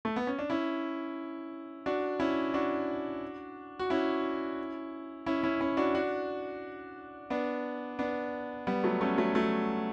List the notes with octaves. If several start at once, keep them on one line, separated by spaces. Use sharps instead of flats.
A3
B3
C#4
D4
C#4 E4
D4 F#4
C#4 E4
D4 F#4
F#4
C#4 E4
C#4 E4
C#4 E4
C#4 E4
D4 F#4
D4 F#4
B3 D4
B3 D4
G3 B3
F#3 A3
A3 C#4
F#3 A3
F#3 A3